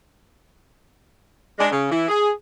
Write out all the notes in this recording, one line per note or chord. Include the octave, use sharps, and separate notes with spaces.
G#3 D4
C#3
E3 E4
G#4